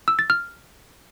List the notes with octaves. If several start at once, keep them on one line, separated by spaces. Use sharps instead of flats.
E6
A6
F6